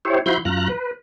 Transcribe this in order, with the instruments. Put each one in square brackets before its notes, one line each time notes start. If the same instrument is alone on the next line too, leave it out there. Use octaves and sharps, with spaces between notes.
[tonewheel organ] E4 G4 C5 C#5
F3 E4 F#4 B5 C6 G6
F#2 F4 A#5 F#6
B4